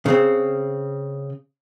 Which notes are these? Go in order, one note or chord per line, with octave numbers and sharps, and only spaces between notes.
C#3 C4